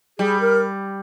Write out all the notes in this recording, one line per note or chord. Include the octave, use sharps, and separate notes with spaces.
G3 G#4
A#4